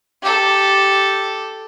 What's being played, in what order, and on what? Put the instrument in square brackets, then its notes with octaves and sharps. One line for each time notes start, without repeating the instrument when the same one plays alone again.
[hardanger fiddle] G4 A4